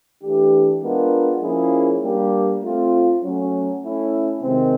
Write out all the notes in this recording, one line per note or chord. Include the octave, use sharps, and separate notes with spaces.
E3 A3 D4 G4
G#3 B3 D4 F4 A#4
F3 A#3 C#4 E4 G#4
G3 A#3 D4 G4
A3 C4 F4
F#3 A3 C#4
A3 C#4 E4
C3 D#3 G#3 C4